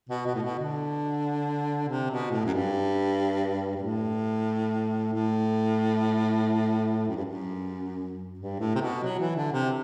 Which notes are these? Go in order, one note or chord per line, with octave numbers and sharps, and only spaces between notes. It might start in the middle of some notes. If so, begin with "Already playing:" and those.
B2
B2
A2
B2
D3
C3
B2
A2
F#2
G2
G2
A2
A2
F#2
G2
F#2
G2
A2
C3
B2
F#3
E3
D3
C3